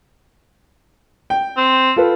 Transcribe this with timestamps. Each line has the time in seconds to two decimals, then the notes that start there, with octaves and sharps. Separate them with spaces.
1.30 G5
1.57 C4
1.96 F4 A4 B4